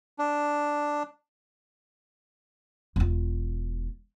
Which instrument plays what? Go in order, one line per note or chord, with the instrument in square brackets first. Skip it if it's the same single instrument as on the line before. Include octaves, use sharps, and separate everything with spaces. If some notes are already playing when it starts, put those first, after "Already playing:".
[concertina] D4
[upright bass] E1 F4